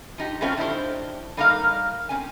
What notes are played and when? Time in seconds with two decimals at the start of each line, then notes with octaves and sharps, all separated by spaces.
0.18 F3 D#4 G4
0.41 B2 G#3 A3 C4 C#4 F4
0.57 D#3 D4 E4 G4 C5
1.37 G3 A#3 D#4 A#4 D#5 F5
2.09 C4 C#4 G#5